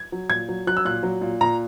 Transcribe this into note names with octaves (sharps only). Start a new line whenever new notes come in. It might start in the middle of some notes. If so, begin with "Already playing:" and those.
Already playing: G#6
F#3
A#2 G#6
F#3
F#3 F#6
E6
A#2 F#6
F#3
A#2
A#2 A#5